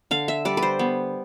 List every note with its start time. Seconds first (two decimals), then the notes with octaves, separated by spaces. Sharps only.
0.11 D3 F5
0.28 E5
0.45 G3 D5
0.57 B4
0.63 C5
0.79 B3